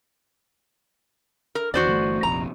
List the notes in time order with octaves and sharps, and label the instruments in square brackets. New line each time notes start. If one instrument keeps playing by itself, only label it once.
[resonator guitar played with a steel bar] A#4
[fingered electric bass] E2 D#3 [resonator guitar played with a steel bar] F#4 C5 D5
[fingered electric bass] G1 E3 A3
[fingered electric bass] F1 A#1 C3 [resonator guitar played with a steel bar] A#5